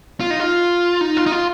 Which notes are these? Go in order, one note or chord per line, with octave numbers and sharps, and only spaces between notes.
F4
D#4
F4
D#4
F4
D#4
F4